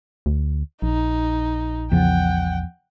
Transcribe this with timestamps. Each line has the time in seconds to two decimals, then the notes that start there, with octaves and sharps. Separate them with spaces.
0.26 D2
0.82 A#1 D#4
1.92 E2 C#3 F3 F#5 G5